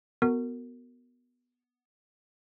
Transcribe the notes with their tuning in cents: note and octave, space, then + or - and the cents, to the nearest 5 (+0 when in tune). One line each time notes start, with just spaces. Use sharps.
B3 +0 F#4 +0 A#4 -25